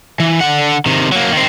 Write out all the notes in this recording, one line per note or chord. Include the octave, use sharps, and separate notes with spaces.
E3
D3 F#5
C3 D#3
F#3 A#3
D#3 C4